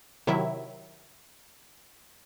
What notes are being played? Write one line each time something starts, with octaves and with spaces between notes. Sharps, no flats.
C3 D#3 F#3 E4 E5